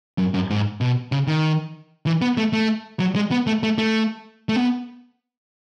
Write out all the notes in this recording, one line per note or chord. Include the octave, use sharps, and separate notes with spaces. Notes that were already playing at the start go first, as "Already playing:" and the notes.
F#2
F#2
G#2
B2
C#3
D#3
E3
B3
A3
A3
F#3
G#3
B3
A3
A3
A3
A3
B3